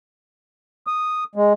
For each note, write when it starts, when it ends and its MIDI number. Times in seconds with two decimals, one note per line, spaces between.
0.87 1.24 87
1.35 1.53 56